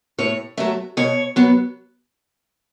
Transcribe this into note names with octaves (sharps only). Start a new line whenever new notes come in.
A2 C#5
F#3 A3 E5
B2 C#5
F#3 B3